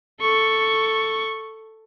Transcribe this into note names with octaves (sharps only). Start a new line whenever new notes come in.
A4 C#6